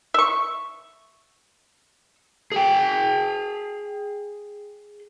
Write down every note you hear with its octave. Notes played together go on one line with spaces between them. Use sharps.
E5 C#6
G#4 G5